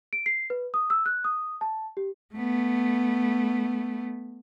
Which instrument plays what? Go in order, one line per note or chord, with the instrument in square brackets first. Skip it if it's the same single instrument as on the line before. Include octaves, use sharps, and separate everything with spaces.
[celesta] D7
C7
B4
D#6
E6
F#6
D#6
A5
G4
[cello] A3 B3